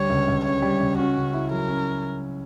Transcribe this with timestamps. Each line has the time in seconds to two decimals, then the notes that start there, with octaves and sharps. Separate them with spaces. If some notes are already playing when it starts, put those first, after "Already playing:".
Already playing: D2 G3 C#5
0.10 C#2
0.27 C#2
0.45 C#3 C#5
0.62 G3
0.80 C#2
0.98 C#4 F#4
1.16 C#3
1.33 E4
1.51 F#3 A#4
1.69 C#4